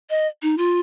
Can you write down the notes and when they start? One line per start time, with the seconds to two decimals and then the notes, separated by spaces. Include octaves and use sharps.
0.10 D#5
0.42 D#4
0.58 F4